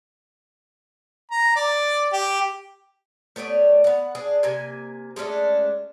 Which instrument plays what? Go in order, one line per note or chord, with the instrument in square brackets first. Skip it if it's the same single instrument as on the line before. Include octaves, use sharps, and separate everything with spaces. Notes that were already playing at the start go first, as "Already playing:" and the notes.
[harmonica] A#5
D5
G4
[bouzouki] A3 B3 C#5 D5
B3 F#5
D4 G#4
C3 A#3 G#5
G#3 A3 C#4 D4